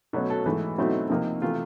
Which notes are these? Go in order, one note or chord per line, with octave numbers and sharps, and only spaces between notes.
B2 F#3 A3 C#4
A4
G#2 E3 A3
B2 F#3 A3 C4 D#4 E4
C3 F3 A#3 D#4
C3 E3 A3 F4